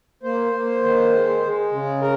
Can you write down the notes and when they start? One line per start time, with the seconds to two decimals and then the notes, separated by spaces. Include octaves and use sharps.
0.23 A#3 C5
0.53 A#3
0.83 D#3
1.13 G#3
1.42 G#3
1.72 C#3
2.01 A#4